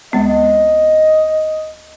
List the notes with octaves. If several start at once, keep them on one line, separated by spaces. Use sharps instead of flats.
D2 G#3 B3 D#5